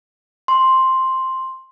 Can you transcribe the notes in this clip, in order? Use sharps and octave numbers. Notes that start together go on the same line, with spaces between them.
C6